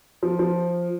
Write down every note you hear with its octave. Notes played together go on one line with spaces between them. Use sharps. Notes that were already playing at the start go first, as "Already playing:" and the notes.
F3
F3